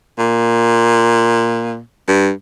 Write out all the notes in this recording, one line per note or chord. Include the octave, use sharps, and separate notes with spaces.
A#2
G2